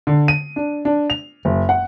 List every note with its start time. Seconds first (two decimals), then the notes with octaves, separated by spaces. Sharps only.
0.07 D3
0.28 D#7
0.56 D4
0.85 D4
1.10 F7
1.45 F#1
1.69 F#5